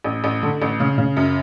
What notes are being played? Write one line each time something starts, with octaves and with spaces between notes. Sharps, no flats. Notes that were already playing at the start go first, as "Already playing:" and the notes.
A1
A1
D3
A1
C#3
C#3
F#2